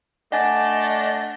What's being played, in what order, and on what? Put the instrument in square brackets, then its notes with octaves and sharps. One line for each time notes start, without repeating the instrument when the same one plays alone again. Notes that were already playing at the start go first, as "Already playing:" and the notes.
[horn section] A3 D4 [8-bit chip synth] D#5 A6 [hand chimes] F#5 G#5